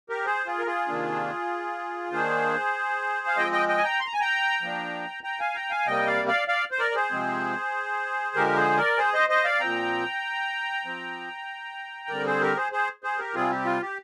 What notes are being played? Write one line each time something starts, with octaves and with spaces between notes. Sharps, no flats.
G4 A#4
G#4 C5
F4 G#4
A#4
F4 G#4
C3 D#3 A#3 D4
D#3 A#3 D4 G#4 C5
F5
F3 G#3 C4 D#5 G5
D#5 G5
D#5 G5
G#5
G5 A#5
C6
A#5
G#5
G5 A#5
F3 A#3 D4
G5 A#5
F5 G#5
G5 A#5
F5 G#5
C3 G3 A#3 D#5 G5
D5 F5
D5 F5
D5 F5
C5
A#4 D5
D5
G#4 C5
C3 F3 G#3 C4
D3 F3 G#3 G4 A#4
G#4 C5
A#4 D5
G#4 C5
C5 D#5
C5 D#5
D5 F5
A#2 F3 C4 G5 A#5
F3 C4
D3 G3 C4 A#4 D5
G#4 C5
G4 A#4
G#4 C5
G#4 C5
G#4 C5
G4 A#4
C3 G3 C4 F4 G#4
G4
F4
G4